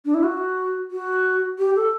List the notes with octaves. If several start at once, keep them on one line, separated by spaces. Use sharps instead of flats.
D4
E4
F#4
F#4
G4
A4